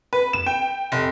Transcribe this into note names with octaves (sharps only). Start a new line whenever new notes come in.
B4
E7
G5
F1